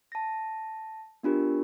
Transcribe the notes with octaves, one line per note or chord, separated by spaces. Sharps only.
A5 A#6
B3 D4 F4 G4 A#4